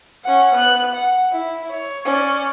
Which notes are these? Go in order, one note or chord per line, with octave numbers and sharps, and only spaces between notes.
C#4 F#5
B3 F#6
F#5
E4
C#5
C#4 D5